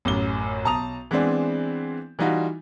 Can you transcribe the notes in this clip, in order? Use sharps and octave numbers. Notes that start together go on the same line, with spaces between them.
A1 F#2 G7
B1 A5 A#5 D#6 F7
E3 G#3 B3 C4 D4
E3 G3 D#4 F4 F#4